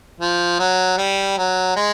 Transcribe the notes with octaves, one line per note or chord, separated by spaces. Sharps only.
F3
F#3
G3
F#3
G#3